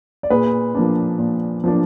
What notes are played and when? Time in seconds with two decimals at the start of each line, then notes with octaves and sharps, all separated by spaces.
0.23 D5
0.30 A#2 G#4 B4
0.75 F3 A#3 D4
1.19 A#2
1.64 F3 A#3 D4